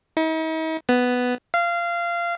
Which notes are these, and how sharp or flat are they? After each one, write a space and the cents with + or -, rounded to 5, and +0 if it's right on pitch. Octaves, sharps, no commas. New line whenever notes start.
D#4 +45
B3 +5
F5 -20